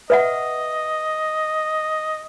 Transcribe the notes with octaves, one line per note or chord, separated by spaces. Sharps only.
B4 D#5 E5 F#5